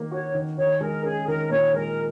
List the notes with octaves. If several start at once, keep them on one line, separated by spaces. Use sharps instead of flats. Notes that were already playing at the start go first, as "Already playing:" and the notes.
Already playing: D#3 A#3
F#4 C#5
D#3
D#3 C#5
G#3 A#4
C#4 G#4
D#3 A#4
A#2 C#5
G#3 A#4